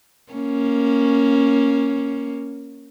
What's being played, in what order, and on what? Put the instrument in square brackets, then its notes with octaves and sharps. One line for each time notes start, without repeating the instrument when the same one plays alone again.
[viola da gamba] A#3 C#4